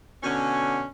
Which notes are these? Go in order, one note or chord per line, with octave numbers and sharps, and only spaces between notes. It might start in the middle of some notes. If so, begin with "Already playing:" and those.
B2 D3 C#4